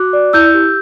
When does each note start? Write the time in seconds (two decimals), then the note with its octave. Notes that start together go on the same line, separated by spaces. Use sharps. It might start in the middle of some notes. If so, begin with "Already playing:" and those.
Already playing: F#4 D6 F#6
0.13 D5
0.33 E4 E6 G6
0.54 G4